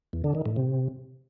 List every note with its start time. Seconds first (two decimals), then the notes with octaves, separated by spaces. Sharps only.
0.13 E2
0.24 D3
0.35 D#3
0.46 A2
0.56 C3